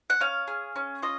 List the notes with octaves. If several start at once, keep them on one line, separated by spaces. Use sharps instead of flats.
F#5
C#4 F5
G#4
C#4
F4 D#5